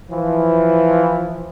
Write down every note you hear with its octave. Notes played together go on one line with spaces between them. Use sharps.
E3 F3